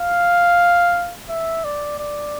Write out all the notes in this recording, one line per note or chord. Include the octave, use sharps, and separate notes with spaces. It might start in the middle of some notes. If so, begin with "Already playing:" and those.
Already playing: F5
E5
D5
D5